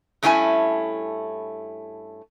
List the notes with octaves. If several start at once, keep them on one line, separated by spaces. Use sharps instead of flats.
G2 A3 C#4 E4 G#4 G#5